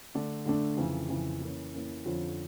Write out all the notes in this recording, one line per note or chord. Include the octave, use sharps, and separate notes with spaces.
D3 A3 D4
D3 A3 D4
F2 C#3 E3
F2 C#3 E3
E3 A#3 C#4
E3 A#3 C#4
F2 D3 F3 C#4 F4